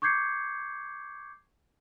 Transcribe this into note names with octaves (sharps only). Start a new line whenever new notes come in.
C#6 D6 G6 G#6 C7 C#7